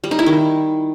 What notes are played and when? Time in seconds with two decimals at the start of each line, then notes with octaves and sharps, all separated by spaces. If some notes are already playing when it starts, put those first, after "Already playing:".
0.04 G3
0.11 D#4
0.19 E4
0.26 D#3